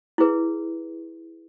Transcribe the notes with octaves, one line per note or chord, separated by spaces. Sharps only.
E4 G#4 B4